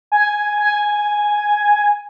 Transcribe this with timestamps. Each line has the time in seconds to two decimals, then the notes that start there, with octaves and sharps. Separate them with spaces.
0.12 G#5
0.58 G#5